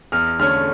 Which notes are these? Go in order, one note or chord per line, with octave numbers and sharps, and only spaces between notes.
E2 F6
D3 A3 C#4 F6